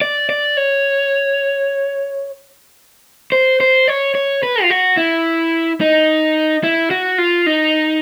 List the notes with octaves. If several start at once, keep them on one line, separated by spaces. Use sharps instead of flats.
D5
D5
C#5
C5
C5
C#5
C#5
B4
F4
F#4
E4
D#4
E4
F#4
F4
D#4